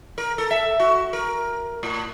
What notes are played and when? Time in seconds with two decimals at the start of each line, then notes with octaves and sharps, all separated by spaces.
0.18 A#4
0.38 A4
0.51 E5
0.80 F#4
1.13 A#4
1.83 A2